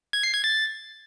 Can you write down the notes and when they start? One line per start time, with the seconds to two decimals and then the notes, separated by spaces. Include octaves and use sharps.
0.13 G#6
0.23 C7
0.34 G#6
0.44 A6